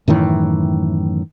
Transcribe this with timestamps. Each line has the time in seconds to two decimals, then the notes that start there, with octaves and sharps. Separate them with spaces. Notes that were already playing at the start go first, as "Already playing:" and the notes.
0.08 F#2 A2 D#3 E3